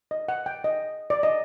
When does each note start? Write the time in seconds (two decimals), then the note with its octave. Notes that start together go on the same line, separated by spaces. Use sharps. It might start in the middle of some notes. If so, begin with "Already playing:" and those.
0.11 D#5
0.29 F#5
0.46 G5
0.64 D#5
1.10 D5
1.23 D#5